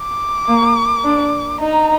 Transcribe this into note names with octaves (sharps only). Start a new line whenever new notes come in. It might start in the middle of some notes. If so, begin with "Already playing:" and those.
Already playing: D6
A#3
D4
D#4 A#5